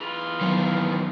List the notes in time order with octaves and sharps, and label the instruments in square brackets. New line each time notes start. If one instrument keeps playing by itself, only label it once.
[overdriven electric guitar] E3 F4 [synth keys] G#4
[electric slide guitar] D#3 F3 [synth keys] F#3 B3